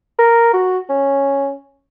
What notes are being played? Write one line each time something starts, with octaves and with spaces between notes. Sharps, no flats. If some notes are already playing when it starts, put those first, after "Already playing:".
A#4
F#4
C#4